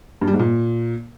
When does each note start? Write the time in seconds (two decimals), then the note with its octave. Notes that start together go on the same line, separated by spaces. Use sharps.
0.21 G2
0.27 G3
0.33 G#2
0.39 A#2